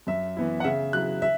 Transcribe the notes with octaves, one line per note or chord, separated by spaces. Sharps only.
F#2 E5
E3 B3 E4
F#5
C#3 E5
F#3 E4 F#6
E5